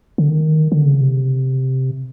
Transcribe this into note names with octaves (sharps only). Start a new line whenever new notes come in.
D3
D#3
D3
C#3
C3